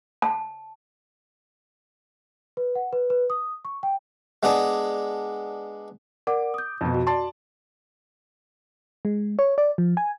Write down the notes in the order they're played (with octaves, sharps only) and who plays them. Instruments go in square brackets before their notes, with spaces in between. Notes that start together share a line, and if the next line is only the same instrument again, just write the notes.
[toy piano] A5
[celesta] B4
F#5
B4
B4
D#6
C#6
G5
[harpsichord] G#3 B3 D4 G#4
[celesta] A#4 D5 F#5 [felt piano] D6
[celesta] D#6 G6
[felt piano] F2 B2
[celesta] F#4
[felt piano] D5 A5 C6
[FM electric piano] G#3
C#5
D5
F3
G#5